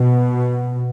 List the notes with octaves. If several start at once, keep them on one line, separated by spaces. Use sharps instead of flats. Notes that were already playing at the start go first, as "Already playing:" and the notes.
Already playing: B2